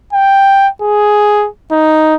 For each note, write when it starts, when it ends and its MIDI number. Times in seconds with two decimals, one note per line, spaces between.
0.13 0.68 79
0.82 1.48 68
1.72 2.15 63